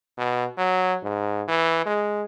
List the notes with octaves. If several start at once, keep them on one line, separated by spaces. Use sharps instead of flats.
B2
F#3
G#2
E3
G#3